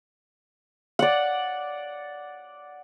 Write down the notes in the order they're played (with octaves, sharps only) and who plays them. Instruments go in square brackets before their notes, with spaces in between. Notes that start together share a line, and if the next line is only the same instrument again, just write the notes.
[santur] D5 F#5